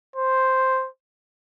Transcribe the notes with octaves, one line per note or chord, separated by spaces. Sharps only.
C5